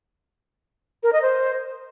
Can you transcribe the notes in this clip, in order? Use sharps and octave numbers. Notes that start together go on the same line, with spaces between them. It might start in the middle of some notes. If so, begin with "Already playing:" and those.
A#4
D#5
C5